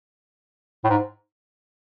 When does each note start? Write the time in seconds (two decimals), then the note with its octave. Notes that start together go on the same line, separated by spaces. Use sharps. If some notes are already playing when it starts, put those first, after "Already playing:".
0.84 A2
0.89 G#2